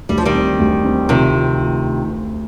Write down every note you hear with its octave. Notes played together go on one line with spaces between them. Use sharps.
D2 G3
F3
D#3 G3
C4
D2
C4
C3 D#3 F3
F3
F3